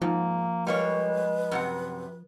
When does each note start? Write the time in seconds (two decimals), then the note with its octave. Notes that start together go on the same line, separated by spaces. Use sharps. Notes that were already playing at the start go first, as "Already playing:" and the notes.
0.02 G#2 F3 A#3
0.67 G3 G#3 A#3 B4 C#5
1.51 F#2 C3 F#5